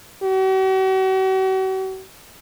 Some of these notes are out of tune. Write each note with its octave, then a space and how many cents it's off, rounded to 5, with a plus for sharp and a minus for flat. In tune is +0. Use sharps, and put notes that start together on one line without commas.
F#4 +45